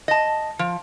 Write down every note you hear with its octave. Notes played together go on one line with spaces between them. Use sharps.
D#5 A5
F3